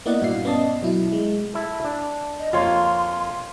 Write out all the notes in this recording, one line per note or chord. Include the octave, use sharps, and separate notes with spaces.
A#3 B3 E4 D5 D#5 F#5
G2 A#2 F#4 E5 F5 C7
B3 C#4 D5 D#5 A5
B2 F#3 E4
G#3
E4 A4
D4
D#5
F2 A#3 F4 C#5 C6